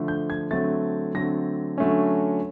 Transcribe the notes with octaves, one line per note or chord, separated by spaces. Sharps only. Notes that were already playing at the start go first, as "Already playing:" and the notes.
Already playing: D3 F3 A3
G6
G#6
D3 F#3 A3 C4 A6
D3 F#3 A3 C4 A#6
D3 F#3 A3 C#4